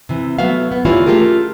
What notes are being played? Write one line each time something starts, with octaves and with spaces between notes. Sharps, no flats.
C3 E3
F#3 A3 B3 F#4 E5 F5
B3
E3 G3 A#3 C#4 E4 F4
A3 F4 G4 G#4 A#4